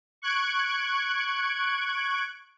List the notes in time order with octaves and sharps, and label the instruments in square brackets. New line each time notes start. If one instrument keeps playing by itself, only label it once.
[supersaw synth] C#6 F#6 G#6 D7